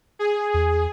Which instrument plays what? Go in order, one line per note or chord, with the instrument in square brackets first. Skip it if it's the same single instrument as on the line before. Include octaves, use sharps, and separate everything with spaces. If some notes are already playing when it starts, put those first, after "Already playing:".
[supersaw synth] G#4
[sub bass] E2